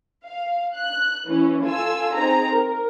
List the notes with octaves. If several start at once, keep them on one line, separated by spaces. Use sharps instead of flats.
F5
F#6
E3 C#4
F4 A4 G#5 E6
C4 D#4 G#4 A#5
A#4